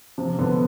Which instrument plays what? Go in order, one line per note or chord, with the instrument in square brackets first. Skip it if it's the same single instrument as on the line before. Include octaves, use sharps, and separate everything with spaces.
[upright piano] C3 [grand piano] F3
[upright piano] D3 [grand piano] B3